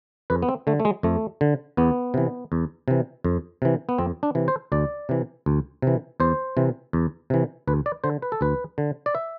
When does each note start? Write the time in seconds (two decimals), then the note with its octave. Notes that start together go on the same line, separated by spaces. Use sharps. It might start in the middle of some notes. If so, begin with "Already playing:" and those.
0.30 F2 B4
0.42 B3
0.49 C4
0.67 D3 A3
0.80 A3
0.85 G#3
1.03 F2 A3
1.41 D3
1.77 E2 B3
2.14 C3 E3
2.52 E2
2.88 C3 E3
3.24 F2
3.62 C3 E3
3.89 B3
3.98 F2 C4
4.23 D4
4.35 C3 E3
4.48 C5
4.72 D2 D5
5.09 C3 E3
5.46 D2
5.82 C3 E3
6.20 E2 C5
6.57 C3 E3
6.93 E2
7.30 C3 E3
7.67 D2 B4
7.86 D5
8.04 D3 C5
8.22 B4
8.32 A4
8.41 D2 B4
8.78 D3
9.06 D5
9.15 E5